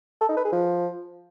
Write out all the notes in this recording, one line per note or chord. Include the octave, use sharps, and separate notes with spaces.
A4
D#4
B4
G#4
F3